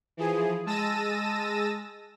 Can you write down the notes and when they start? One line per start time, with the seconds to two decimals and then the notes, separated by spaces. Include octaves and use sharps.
0.17 E3 F3 G#4
0.66 G#3 A5 E6 A#6 D#7